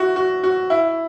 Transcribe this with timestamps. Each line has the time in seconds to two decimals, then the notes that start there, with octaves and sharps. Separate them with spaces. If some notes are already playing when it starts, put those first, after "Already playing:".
Already playing: E4 F#4
0.16 F#4
0.43 F#4
0.70 E4